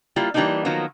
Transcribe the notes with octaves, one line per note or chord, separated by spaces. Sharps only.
G3 A#3 E4 F4
E3 G3 A#3 C4 D4 D#4
D#3 F3 F#3 A#3 B3